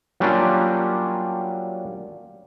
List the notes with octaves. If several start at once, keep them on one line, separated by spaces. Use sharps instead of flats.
F#3 G3 A#3 C#4 D4 F4